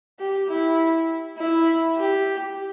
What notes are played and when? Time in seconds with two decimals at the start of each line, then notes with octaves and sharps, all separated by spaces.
0.19 G4
0.49 E4
1.38 E4
1.97 G4